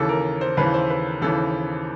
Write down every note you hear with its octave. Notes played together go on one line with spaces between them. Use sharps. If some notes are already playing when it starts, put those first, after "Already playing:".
Already playing: D#2 C#3 E3 A4
A#4
C5
D#2 C#3 E3 B4
C5
B4
D#2 C#3 E3 A4